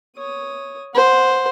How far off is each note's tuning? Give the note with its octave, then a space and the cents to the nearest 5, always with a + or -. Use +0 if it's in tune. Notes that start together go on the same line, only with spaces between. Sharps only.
C#5 +0 D#6 +0
C5 +0 F#5 -10